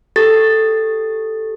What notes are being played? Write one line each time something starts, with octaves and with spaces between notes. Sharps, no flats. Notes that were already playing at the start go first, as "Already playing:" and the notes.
G4 A4 A6